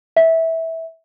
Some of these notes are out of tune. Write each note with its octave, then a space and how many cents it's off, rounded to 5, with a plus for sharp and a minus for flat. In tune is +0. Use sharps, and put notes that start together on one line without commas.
E5 -15